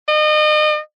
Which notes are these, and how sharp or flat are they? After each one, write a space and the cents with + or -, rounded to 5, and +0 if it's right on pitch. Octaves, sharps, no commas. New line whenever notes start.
D#5 -35